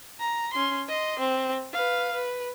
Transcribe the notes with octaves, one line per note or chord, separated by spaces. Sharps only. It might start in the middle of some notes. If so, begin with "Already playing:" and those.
A#5
C#4 C6
D#5 C6
C4
B4 F5
B4